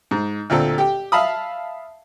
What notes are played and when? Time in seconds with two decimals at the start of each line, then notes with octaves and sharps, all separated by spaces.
0.11 G#2
0.50 D2 A#2 C4 A4
0.78 G4 G5
1.12 E5 F5 A5 B5 D#6